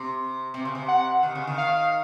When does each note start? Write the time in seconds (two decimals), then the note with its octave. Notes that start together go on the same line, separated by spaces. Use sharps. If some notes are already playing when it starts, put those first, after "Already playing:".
Already playing: C3
0.54 C3
0.65 C#3
0.75 C3
0.88 F#5
1.23 D#3
1.35 C#3
1.47 D#3
1.58 F5